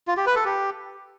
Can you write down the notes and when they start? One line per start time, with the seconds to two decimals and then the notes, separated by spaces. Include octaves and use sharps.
0.08 F4
0.17 G4
0.26 B4
0.36 A4
0.45 G4